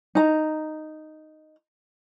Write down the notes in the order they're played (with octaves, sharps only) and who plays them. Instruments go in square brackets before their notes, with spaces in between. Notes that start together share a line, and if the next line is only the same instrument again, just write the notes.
[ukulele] D#4 A#5